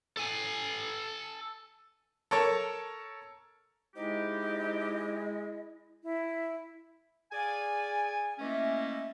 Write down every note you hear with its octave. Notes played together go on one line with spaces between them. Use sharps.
A4 G#5
A4 A#4 C#5 A5
G#3 C4 D#4 E4 G4 D#5
E4
G#4 D5 F5 G#5
E3 A3 A#3 C#4 D#5 E5